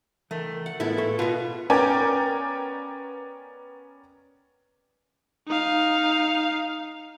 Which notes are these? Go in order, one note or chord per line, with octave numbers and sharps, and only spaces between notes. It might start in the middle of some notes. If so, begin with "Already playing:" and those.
E3 A3 A#4
F#5
A2 G#3 B3 E4 F4 A4 A#4
A3
B2 F4 B4 C#6
B3 C#4 A#4 D5 G5 G#5
D#4 F5